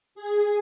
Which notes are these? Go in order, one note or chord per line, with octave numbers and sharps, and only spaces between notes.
G#4